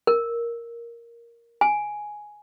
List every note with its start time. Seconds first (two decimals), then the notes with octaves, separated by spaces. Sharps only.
0.07 A#4
1.61 G#5